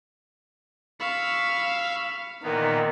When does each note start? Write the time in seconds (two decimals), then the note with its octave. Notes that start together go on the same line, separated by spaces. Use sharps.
1.00 F5 B5 C#6 E6
2.43 A#2 D#3 E3 B3